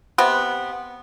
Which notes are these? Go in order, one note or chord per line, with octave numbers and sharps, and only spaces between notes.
C3 B3